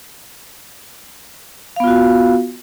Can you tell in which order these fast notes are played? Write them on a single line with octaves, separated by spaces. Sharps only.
F5 B3 F4 F#4